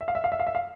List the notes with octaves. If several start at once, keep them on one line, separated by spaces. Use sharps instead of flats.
E5
F5
E5
F5
E5
F5
E5
F5